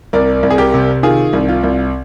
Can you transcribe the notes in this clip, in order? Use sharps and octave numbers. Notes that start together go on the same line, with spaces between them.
C2 A#4 D5
C2
G#4
G4 A#4
C3
D#3 F4 G#4
C2
F4
C2